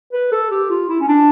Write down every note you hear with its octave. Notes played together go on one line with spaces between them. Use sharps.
B4
A4
G4
F4
E4
C#4
D4